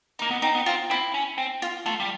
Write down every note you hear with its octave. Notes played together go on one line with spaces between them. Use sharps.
D#4
A#3
B3
C4 D#4
B3
C4 F4
C4 E4
C#4
C4
F4
A3 F4
G3